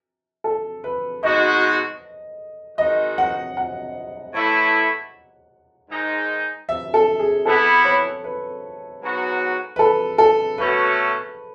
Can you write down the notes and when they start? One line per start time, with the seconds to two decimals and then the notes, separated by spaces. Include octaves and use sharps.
0.44 A4
0.84 B4
1.23 B2 G#3 D#4 F#4 D#5
2.78 D#3 G#3 D#4 F#4 D#5
3.18 F#5
3.57 F#5
4.34 A2 E3 A3 E4
5.90 G#2 D#3 G#3 D#4
6.69 E5
6.94 A4
7.19 G#4
7.45 E3 B3 E4 A4
7.85 C#5
8.24 B4
9.01 G#2 F#3 B3 F#4
9.76 B4
9.79 A4
10.18 A4
10.58 B2 A3 C#4 F#4 B4